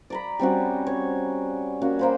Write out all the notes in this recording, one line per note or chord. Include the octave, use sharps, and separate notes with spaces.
D5 A#5 B5
G3 C4 C#4 F#4
C#5
A#3 C#4 F#4
A#3 C5 B5